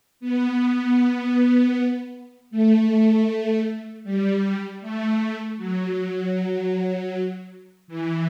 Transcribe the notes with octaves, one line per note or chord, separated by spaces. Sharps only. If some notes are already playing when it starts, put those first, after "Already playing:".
B3
A3
G3
A3
F#3
E3